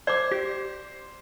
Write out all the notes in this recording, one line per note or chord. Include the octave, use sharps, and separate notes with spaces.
C5 D5 D6
G4